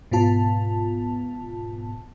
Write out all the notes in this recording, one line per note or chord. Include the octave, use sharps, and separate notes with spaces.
G#2 B2 B3 F4 A5